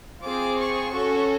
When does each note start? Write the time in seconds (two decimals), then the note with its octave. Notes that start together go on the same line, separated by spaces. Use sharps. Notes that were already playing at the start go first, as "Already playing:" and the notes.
0.23 C4 F4 G#4 D6
0.58 C#6
0.93 C#4 F#4 A4